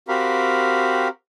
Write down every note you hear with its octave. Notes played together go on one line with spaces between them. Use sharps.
C4 F#4 G4 A#4 F5 B5